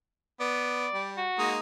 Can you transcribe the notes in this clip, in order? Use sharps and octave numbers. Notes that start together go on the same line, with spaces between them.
B3 D5
G3
F#4
G#3 A#3 D#4